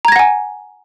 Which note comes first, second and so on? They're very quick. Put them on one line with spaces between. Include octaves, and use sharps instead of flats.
A#5 G#6 A#6 F#5 G#5